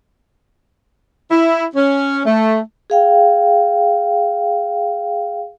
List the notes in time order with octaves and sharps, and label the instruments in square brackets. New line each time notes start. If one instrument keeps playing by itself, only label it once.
[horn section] E4
C#4
A3
[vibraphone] G#4 F5 G5